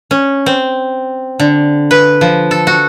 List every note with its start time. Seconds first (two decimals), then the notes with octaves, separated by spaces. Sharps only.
0.11 C#4
0.46 C4
1.40 D3
1.91 B4
2.21 F3
2.51 A4
2.67 F#4